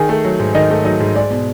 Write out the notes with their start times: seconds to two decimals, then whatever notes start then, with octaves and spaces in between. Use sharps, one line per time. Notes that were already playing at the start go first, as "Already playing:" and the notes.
Already playing: D#3 G#4 G#5
0.09 A3
0.25 F#3
0.40 G#2
0.55 D#3 D#4 D#5
0.70 A3
0.85 F#3 D#4 D#5
1.00 G#2
1.15 G#3 D5
1.30 B2